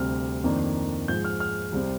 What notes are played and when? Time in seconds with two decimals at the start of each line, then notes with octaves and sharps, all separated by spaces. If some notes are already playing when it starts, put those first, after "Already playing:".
Already playing: D2 C3 G3 F6
0.44 F2 D#3 A#3 D4
1.08 G#2 F3 G#3 G6
1.24 F6
1.40 F6
1.72 C2 C3 G3 C4